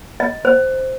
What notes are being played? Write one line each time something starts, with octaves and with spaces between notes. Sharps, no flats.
D#5
C5